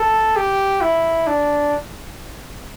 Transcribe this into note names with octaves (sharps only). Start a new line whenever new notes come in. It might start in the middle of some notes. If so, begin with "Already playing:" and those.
Already playing: A4
G4
E4
D4